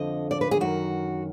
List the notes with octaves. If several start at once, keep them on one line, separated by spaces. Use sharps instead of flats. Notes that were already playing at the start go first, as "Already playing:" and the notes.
Already playing: F2 D3 F3 D#5
D5
B4
G#4
F#2 D#3 F#4